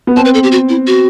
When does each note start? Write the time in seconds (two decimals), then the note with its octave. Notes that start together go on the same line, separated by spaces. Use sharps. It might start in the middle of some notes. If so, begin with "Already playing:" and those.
0.07 B3
0.16 C4 A5
0.25 B4
0.34 A4
0.43 G4
0.52 F#4
0.69 E4
0.87 F#4